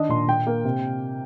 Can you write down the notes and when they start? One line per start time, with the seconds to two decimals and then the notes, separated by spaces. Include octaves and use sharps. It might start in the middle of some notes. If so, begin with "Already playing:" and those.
Already playing: D#3 D4 D#5
0.09 A#2 C6
0.28 A#2 G5
0.47 A#3
0.65 C3